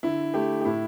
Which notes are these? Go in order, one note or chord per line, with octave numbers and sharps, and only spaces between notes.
D3 E4
A3 G4
G4
A2 E4